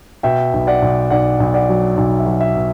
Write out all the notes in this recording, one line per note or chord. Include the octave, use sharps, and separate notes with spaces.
B2 E5 G5
B1
D5 F#5
B1
B1 D5 F#5
B1
D5 F#5
F#3
B1
E5
F#3
E5
B2